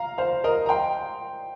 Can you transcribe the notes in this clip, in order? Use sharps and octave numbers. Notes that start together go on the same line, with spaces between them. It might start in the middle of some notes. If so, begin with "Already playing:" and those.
Already playing: F5 A#5
C5 F5
A#4 D#5
A#5
G5 C6